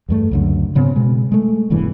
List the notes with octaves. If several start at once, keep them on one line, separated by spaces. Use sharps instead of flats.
E2 G2 A3
C#2 F#2 D3
G#2 C#3 B3 C4
B2 G#3
G#3 A3
E1 E2 G2 E3